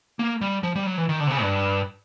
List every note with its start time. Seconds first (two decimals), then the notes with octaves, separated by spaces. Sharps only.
0.19 A#3
0.41 G3
0.63 F3
0.75 G3
0.86 F#3
0.97 E3
1.09 D#3
1.20 D3
1.27 C3
1.31 C#3
1.42 G2